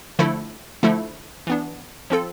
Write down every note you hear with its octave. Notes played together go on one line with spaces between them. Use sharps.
D3 F3 A3 E4 A4
D3 F3 A3 E4 A4
E3 B3 D4
F3 C4 F4 A4